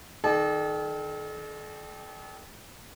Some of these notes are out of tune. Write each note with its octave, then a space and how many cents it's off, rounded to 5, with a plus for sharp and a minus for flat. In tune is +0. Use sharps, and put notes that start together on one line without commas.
D#3 +0 A4 -45 D5 +35